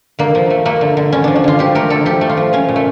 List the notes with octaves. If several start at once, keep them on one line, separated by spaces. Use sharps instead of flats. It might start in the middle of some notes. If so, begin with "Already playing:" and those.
D3 A#3
F3
A3
A3 A#3
D3
D3
D3 C#4
F3 D4
D4
D3 F4
F3 G4
A3 A#4
D3 A4
F3 G4
A3
F4
F3
F3 C#4
A#2
A3